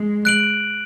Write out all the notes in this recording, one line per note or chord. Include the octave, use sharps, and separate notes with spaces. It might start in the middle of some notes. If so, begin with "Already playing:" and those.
Already playing: G#3
F#6 D7 F#7